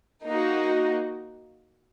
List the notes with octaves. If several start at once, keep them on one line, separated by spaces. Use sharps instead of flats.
A#3 D#4 F#4